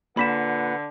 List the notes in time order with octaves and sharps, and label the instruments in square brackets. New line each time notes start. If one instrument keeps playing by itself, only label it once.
[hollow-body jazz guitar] A#2 [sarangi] D3 [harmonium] B4 F#5 [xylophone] B5 B6 E7